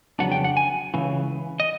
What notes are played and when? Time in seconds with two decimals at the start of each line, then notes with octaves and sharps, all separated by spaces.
0.19 F2 C#3 F#3 B3 D4 F#5
0.32 G5
0.44 F#5
0.57 G#5
0.94 C#2 C#3 E3
1.60 D#5